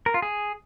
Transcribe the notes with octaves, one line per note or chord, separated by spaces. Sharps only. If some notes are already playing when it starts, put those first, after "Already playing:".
A#4
F4
G#4